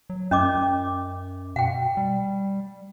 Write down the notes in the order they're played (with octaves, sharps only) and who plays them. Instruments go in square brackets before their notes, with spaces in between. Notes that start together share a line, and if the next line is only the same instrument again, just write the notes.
[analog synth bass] F#3
[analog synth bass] F#2 [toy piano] C#4 D#5 D6
[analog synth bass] B2 [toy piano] F#5 G5
[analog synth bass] G3